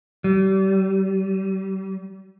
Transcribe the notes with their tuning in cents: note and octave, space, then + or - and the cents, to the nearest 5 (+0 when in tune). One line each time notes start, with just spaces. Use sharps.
G3 -35